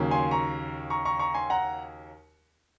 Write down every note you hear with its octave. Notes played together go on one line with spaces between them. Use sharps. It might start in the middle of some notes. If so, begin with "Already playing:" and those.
Already playing: D#2 C#3 F#3 A#3
G#5 C6
A#5 C#6
A#5 C#6
A#5 C#6
A#5 C#6
G#5 C6
F#5 A#5